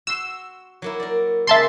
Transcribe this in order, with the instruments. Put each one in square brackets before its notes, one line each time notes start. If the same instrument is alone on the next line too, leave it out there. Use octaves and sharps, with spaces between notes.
[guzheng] F#4 C6 [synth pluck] E6
[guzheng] F#3 A#3 E4
A#4 D5
[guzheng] C#3 G#3 A#3 [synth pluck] E5 A5 C6